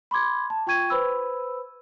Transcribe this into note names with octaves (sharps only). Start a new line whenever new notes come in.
B5 C6 D6 G#6
A5
F4 G5 C#6 G#6 D#7
B4 C5 B5 E6